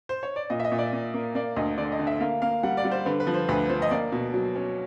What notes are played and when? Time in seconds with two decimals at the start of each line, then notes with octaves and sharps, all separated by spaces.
0.09 C5
0.23 C#5
0.36 D5
0.50 A#2 D#5
0.60 E5
0.65 D#5
0.72 A#2
0.78 D5
0.93 A#2
1.14 A#3
1.35 A#3 D5
1.56 D2 D#5
1.78 D3 D5
1.92 D#5
1.99 D3
2.07 E5
2.20 A#3 F5
2.42 A#3 F5
2.63 G3 F#5
2.77 D5
2.85 G3
2.91 C5
3.06 D3 B4
3.20 B4
3.27 F3
3.34 C5
3.49 D2 B4
3.70 F3 C5
3.82 D#5
3.91 A#3 D5
4.12 B2
4.34 F#3
4.55 C#4